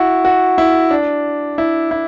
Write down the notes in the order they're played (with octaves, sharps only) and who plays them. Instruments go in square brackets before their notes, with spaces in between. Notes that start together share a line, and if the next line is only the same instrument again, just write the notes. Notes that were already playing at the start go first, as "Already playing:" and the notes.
Already playing: [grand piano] E4 F#4
F#4
E4
D4
E4
E4